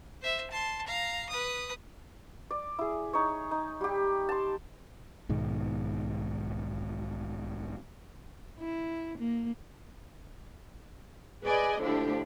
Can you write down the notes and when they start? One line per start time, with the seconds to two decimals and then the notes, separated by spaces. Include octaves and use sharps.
0.21 C5 E5
0.51 A5 C6
0.87 F5 A#5
1.29 B4 D#6
2.51 D5
2.79 E4 G#4
3.13 D#4 C#5
3.51 D#4
3.81 G3 G4
4.29 A5 C6
5.29 B1 G#2 B2 D#3
8.58 E4
9.18 A#3
11.43 G#4 B4 D5 D#5 G#5
11.79 A2 D3 F3 D4 E4 G4